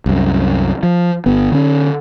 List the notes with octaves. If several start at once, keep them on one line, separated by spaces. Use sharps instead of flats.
C2 F#2
F3
G1 B3
D3 C#4